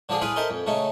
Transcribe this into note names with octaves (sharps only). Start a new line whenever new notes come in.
D3 F3 D4 G#4
E4 F4 G#4 B4
A4 A#4 C5 D#5 E5
F2
C#3 A3 D#4